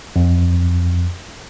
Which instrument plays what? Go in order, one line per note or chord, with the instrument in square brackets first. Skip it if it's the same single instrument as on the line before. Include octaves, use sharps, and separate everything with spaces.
[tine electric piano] F2